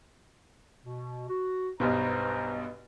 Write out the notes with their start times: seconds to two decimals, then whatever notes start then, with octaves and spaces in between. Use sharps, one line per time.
0.84 B2
1.29 F#4
1.80 B1 G2 B2 B4 C5 A#5